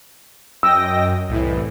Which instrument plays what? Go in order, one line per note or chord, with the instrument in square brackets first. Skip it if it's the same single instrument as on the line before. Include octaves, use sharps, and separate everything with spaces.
[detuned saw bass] F#2 [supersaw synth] D#5 G5 A#6 [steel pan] E6
[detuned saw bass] C2 [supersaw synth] A2 E3